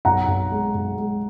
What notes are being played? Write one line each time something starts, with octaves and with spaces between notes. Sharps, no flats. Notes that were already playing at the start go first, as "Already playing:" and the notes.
B1 F#5 A#5
B1
G#3
B1
G#3